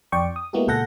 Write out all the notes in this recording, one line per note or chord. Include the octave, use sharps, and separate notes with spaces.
F2 D5 G5 C#6
D#6
G#3 A#3 B3 E4 F#4 G4
C#2 A#2 A4 F#5 G6 A#6